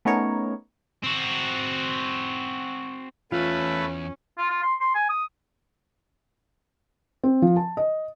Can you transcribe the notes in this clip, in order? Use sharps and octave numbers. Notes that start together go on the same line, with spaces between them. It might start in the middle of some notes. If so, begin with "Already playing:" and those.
A3 B3 C#4 D#4 A#4 C#5
C4 F#4
E2 A3 C#4 F4 B4
F4
F4
C6
C6
G#5
D#6
C4
F3
A5
D#5